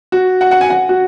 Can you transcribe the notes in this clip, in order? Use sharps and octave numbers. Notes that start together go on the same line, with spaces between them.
F#4
F#5
F#5
G#5
F#5
F#4